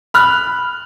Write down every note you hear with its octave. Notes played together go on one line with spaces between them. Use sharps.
B5 F6 F#6